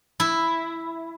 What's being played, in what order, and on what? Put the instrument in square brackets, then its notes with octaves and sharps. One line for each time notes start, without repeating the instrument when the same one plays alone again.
[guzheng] E4